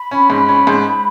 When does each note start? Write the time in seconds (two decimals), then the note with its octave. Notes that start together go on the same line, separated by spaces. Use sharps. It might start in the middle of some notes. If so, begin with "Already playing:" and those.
Already playing: B5
0.11 C#4
0.30 G#2
0.49 C#4
0.67 G#2